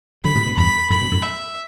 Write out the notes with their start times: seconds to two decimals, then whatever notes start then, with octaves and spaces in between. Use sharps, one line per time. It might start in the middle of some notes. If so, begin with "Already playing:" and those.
0.24 D3 F#3 B5
0.35 A2 C3
0.46 G2 B2
0.57 E2 G2 B5
0.90 F#2 A2 B5
1.01 G2 B2
1.11 F#2 A2
1.22 E5